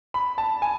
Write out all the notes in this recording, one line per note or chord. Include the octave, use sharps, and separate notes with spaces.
B5
A5
G#5